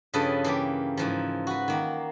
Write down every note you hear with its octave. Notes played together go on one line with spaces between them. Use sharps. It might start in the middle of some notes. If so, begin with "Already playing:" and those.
G2 C#3 F3 A4 B4 D#5
E3 A#3 G4
G#2 E3 F3
F#4 B4
D#3 A#3